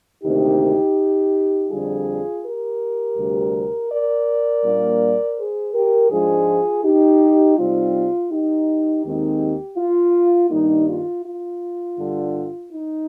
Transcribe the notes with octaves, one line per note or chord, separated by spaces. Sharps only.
D2 C3 D#3 A#3 D#4 G4
F2 D3 G3 F4 G#4
G4 A#4
D2 C3 G3
A#4 D5
A#2 G3 A#3 D4
G#4 C5
G4 A#4
G#2 F3 G#3 D4 F4 G#4
D#4 G4
C3 G3 C4 D#4 F4
D#4 G4
D#2 D#3 G#3 C4 D#4
F4
G2 D#3 G3 A#3 D#4
F4
F4
G2 D3 G3
D#4